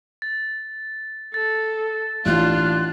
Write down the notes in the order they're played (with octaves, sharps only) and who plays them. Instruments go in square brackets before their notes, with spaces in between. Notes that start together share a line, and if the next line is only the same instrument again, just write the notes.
[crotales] A6
[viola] A4 [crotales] A6
[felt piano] A1 [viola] D4 F4 [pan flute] F#6